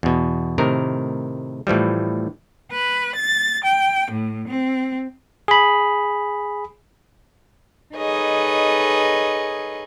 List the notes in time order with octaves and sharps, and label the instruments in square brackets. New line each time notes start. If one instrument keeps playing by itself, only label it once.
[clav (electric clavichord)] E2 B2
A2 C3 D#3 A#4
A2 E3 F3 G3
[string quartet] B4
A6
G5
A2
C4
[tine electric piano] G#4 B5
[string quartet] D#4 G#4 A4 B4 C#5 D#5